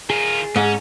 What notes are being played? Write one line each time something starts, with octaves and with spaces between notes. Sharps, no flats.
D#3 F4 G#4
G#2 C#4